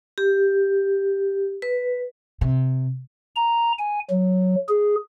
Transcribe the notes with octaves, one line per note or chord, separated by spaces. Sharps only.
G4
B4
C3
A#5
G#5
F#3
G#4